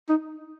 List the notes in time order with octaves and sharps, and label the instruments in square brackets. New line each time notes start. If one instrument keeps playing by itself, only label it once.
[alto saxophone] D#4